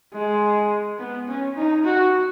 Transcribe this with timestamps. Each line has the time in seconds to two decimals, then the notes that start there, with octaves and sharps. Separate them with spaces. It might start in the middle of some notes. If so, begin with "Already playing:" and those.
0.13 G#3
0.99 B3
1.28 C#4
1.56 D#4
1.85 F#4